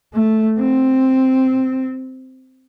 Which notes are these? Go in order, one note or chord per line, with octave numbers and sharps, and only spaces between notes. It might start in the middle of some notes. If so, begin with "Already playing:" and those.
A3
C4